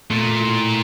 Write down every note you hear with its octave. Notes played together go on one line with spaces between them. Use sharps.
A#2 A3
A2